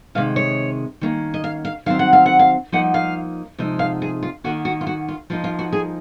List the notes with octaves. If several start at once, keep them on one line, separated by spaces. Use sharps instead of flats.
C3 D#3 G#3 F5
C#5
D#3 A#3 C#4
D#5
F5
F5
D#3 F#3 C4 F5
F#5
F5
F#5
F5
F3 A#3 D#4 F#5
F5
C3 F3 G#3 D#4
F5
G#4
F4
D#3 A#3 C#4 F#4
F#4
F4
F#4
F4
F3 A#3 D#4 F4
F4
F#4
G#4